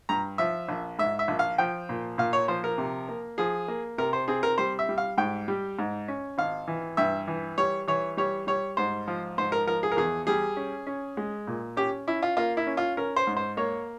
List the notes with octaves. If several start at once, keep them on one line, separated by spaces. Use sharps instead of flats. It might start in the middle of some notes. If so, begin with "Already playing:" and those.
G2 A#5
F3 E5
A#1
G#2 E5
E5
A#1
F5
F3 G5
A#2
A#2 F5
C#5
F3 C5
A#4
C3
A#3
F3 G#4
A#3
C3 A#4
C5
C4 G#4
A#4
G3 C5
E5
G3
F5
G#2 G5
G3
G#2
C#4
G#1 F5
E3
G2 E5
E3
G3 C#5
E3 C#5
G3 C#5
G3 C#5
G#2 C5
F3
G#2 C5
A#4
F3 A#4
G#4
A#4
E2 G#4
G3 G#4
C#4
C#4
G#3
A#2
C#4 G4
C#4 E4
F4
A#3 F4
E4
C#4
F4
C#4 A#4
C5
G#2
C5
A#3 C#5